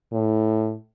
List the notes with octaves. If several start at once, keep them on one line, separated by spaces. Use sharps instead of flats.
A2